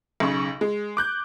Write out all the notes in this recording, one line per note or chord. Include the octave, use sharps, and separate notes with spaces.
B1 C#3 C#6
G#3
D6 F#6 G6